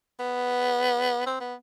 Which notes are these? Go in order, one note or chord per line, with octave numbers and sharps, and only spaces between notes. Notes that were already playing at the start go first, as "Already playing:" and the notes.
B3
C4
B3